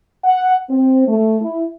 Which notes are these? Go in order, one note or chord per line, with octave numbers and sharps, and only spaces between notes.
F#5
C4
A3
E4